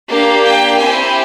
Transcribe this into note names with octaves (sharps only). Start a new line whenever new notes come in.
A#3 D4 G4 F5
G5
C4 E4 G4 G#5